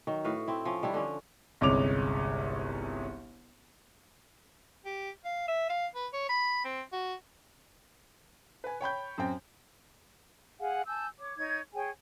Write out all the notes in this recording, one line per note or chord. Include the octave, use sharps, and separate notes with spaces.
D#3 F#3
A2 F#4 B4 F5
C4 E4
F3 C#4
D#3 G3 D4 E4
D3 F3 C#4
G1 C2 G#3 C#4 D6 F7
G4
F5
E5
F5
B4
C#5
B5
C4
F#4
B4 G#5
C#5 G5 B5 G6
F#2 C4 G5
G#4 F5 F#5 G#5
G#5 A5 E6 G6
C#5 D6
D#4 C#5 G#6
G#4 C#5 G5 G#5